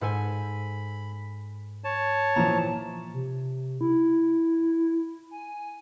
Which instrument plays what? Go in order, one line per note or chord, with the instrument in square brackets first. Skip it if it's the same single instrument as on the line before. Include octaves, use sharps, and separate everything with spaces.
[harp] G#2 A4 G#5 [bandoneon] B5
[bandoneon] C#5 A5
[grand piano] A#2 E3 F3 [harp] A#5
[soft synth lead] C3
E4
G#5